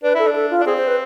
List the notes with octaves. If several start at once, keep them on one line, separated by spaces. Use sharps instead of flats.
D4 B4
E4 A4
D4
A4
F4
D4
C4 G#4
C5
B4